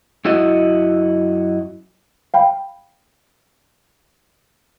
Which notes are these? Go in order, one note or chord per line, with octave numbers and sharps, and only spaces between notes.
F#2 E4 F#4 D#5
F5 G5 B5